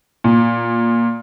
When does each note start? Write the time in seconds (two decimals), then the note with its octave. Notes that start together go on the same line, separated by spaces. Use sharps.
0.24 A#2